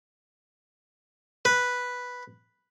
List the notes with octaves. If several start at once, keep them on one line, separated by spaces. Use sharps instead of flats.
B4